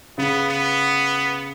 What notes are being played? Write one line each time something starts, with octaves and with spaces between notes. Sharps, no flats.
C#3 B3
B3